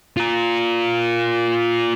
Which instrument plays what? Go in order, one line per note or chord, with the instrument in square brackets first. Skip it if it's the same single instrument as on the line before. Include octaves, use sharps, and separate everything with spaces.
[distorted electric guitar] F4 A#4